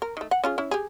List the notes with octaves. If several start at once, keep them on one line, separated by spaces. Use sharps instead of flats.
A#4
D#3 A3
F#5
C#4 F4 G#4
C#4 E4
G4 G#4